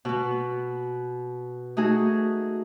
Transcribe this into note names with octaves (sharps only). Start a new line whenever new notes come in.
B2 B3
A3 D#4 F#4 G#4